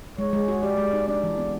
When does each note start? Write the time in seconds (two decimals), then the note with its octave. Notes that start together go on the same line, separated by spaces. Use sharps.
0.18 G#3 C#5
0.33 G#3
0.48 F#4
0.63 G4 D5
0.78 G#3
0.93 D#4
1.08 D4 D5
1.24 E3
1.38 B3